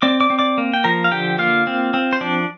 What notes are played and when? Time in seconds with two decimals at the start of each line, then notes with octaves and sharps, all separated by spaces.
0.02 C4 D5 D6
0.21 D5 D6
0.30 C4
0.39 D5 D6
0.58 A#3
0.74 G5
0.84 F3 A#4 A#5
1.04 F5
1.12 D3 G4 G5
1.38 A#3 F4 F5
1.67 C4
1.94 C4
2.13 C5
2.21 F3 D4 D5